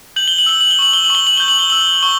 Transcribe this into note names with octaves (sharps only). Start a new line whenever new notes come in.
G6 F#7
G7
F#7
E6 G7
F#7
G7
C#6 F#7
G7
F#7
C#6 G7
F#7
G6 G7
F#7
G7
E6 F#7
C#6 G7